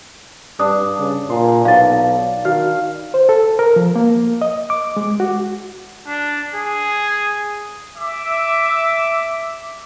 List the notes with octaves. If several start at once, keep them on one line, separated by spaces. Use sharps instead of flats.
G2 D4 D#6
C#3
A#2 C6
B1 F5 A6
D#3 F#4 F5
C5
A4
A#4
F3
A#3
D#5
D6
G#3
F#4
D4
G#4
E5 D6